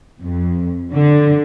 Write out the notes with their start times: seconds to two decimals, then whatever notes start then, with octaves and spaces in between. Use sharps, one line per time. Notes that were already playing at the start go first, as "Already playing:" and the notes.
0.21 F2
0.93 D3